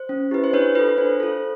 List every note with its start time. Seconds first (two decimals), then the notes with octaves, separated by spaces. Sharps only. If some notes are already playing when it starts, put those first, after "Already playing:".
Already playing: C5
0.09 C#4
0.31 E4 G4 B4
0.44 C5
0.53 D4 B4 C#5
0.75 F4 A4 B4
0.98 D4 C5
1.20 F4 A4